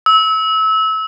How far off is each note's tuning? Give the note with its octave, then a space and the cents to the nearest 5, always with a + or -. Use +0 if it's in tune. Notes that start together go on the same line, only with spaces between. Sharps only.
E6 -25